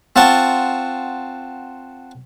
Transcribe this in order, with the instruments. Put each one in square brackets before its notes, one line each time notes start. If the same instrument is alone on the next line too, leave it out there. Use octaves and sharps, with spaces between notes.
[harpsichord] C4 F4 F#5 A5 C#6